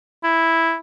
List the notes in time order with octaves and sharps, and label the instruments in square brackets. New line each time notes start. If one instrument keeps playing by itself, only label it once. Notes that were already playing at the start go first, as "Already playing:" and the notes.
[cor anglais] E4